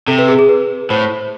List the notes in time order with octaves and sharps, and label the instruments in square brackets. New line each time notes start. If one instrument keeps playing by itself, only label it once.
[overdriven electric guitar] C3 [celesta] A4
[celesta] B4
G#4
G#4
B4
[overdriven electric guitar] A2 [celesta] C5